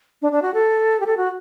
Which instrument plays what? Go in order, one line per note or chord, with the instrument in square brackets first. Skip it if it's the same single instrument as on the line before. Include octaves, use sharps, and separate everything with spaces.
[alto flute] D4
D4
F#4
A4
G4
A4
F#4